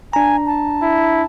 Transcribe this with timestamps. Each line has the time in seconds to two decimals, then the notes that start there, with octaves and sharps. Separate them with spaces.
0.13 D4 G#5 A#5
0.47 A5
0.82 E4